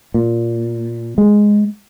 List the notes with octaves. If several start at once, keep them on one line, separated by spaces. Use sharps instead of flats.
A#2
G#3